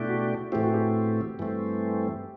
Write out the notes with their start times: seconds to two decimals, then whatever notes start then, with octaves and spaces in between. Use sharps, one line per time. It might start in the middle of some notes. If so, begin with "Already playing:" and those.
Already playing: B2 A3 D4 E4 G4
0.09 F#4
0.52 A2 E3 A3 C4 G4
0.63 F#4
0.73 G4
1.39 G2 E3 A3 C4